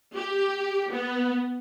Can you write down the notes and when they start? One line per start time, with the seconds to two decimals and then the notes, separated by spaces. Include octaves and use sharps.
0.15 G4
0.91 B3